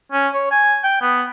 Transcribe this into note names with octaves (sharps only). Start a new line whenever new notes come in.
C#4
C#5
G#5
G5
B3